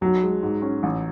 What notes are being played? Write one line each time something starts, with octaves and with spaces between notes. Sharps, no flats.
B1 F#3
G#3
G#2
C#4
A1